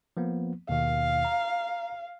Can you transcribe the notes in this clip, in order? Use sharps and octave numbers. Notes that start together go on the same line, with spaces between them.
F3 A#3 B3
D#2 B2 D#3 F5
A#5